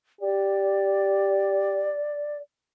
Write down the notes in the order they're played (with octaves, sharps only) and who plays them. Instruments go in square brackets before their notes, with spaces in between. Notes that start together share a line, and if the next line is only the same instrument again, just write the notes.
[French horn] G4 [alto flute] D5